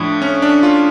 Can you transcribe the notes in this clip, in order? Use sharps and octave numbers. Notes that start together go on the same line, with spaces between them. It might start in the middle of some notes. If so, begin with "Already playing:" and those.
Already playing: A2 F3 D4
C#4
D4
F4